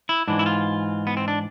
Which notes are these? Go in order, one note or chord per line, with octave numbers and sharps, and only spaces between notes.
E4
G#2 E3 D4
E4
F4
B3
C4
D4